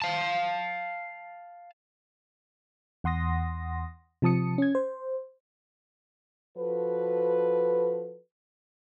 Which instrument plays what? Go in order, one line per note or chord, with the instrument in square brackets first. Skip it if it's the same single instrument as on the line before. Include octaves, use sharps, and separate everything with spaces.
[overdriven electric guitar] F5 A5
[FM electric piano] E2 F#5 C6 D#6 A#6
C3 F3 A5 D#6 C#7
C#4 G#6
C5
[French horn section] F3 F#4 A4 B4